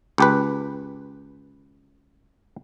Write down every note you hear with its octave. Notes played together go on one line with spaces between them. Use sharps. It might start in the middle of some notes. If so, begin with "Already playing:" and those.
C#2 G4 B4